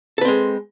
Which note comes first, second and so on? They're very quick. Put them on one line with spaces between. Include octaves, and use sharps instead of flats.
A4 B4 C4 G#3